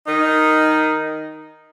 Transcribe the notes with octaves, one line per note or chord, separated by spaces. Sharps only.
D#3 D#4